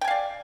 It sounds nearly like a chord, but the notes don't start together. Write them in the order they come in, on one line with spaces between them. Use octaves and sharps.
G5 G#5 F5 D5